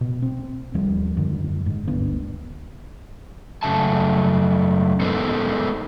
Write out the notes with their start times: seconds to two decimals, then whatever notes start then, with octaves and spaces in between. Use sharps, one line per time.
0.01 B2
0.22 C4
0.74 D#2 F3 G3
1.17 F#2 D3 D#3
1.66 G#2
1.87 G1 D2 D3 B3
3.63 F#2 C#3 A3 A5
5.01 G#3 B3 D#4 A4 A#4 C5